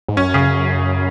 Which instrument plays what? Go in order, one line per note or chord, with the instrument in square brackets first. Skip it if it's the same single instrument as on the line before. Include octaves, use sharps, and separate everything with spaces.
[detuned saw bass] G#2
[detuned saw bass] F#2 [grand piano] C#4
[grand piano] C#3